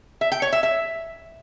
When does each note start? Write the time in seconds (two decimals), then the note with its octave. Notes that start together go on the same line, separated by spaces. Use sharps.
0.21 E5
0.32 G5
0.42 C#5
0.53 E5
0.63 E5